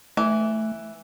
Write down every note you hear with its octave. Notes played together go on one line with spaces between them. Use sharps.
E3 A3